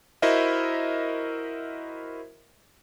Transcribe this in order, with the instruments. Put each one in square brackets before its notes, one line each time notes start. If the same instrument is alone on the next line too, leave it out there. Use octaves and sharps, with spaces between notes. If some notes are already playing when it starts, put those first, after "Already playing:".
[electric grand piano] E4 F#4 A#4 C5 D#5 E5